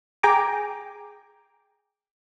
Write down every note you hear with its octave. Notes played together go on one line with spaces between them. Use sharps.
G#4 G5 G#5 A#5 D6